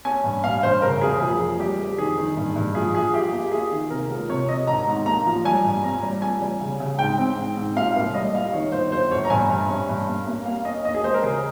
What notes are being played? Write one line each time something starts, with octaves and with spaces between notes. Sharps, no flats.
C#4 G#5
G2
G2 F5
G2 C5
C#3 A#4
F1 G#4
F3 G#4
F3
G3 G4
F1
D#3 G#4
D#3
G2
G2
F3 G#4
F3 G#4
F4 G4
A#3
F4 G#4
D#3
C3 A#4
C#2
C3 C#5
C3 D#5
G#1 A#5
G#2
A#3 A#5
F3
G3 G#5
G2
C4 A#5
G3
C#2 G#5
G3
C#3
C#3
G#2 G5
C4
G#2
G#2
A#2 F5
C2
G3 D#5
A#2 F5
D#3 C#5
G1 C5
G1 C5
G1 C#5
A#5
G2 G#5
G2
C#4
G2
A#3
A#3
A#3 F5
C#4 D#5
D#2 D#5
G#4
G#3 C5
A#4
C#3 G#4